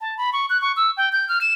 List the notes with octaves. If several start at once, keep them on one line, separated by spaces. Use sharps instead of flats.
A5
B5
C#6
F#6
C#6
E6
G5
G6
F6
E7